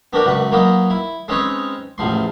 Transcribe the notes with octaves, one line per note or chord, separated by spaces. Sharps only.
B3 D4 F#4 G4 A#4
C#2 F#2 F#4 B4
F#3 A#3 B3 D#4
E4
G#3 C4 C#4 D#4 B4 C#5
A1 E2 F3 C6